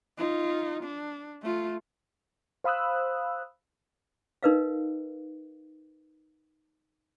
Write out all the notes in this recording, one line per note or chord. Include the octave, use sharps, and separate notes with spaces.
D#4 F4
D4
A3 F4
C5 F5 B5 D#6 E6 F#6
D#4 A#4 B4 D#5 F5